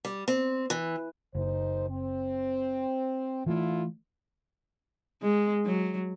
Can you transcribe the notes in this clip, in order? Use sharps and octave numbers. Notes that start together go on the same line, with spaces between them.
G3
C4
E3
F#1 D#2 D#4 C5
C4
D3 E3 A3 E4 F4
G#3
F#3